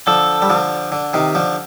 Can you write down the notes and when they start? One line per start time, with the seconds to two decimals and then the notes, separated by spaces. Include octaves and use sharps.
0.07 D3 F3 A4
0.42 G3
0.50 D3 F3
0.92 D3
1.14 C3 D#3
1.35 D3 F3